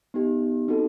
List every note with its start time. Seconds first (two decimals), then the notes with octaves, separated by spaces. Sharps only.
0.14 B3 D#4 G4
0.68 C4 D#4 F#4 A4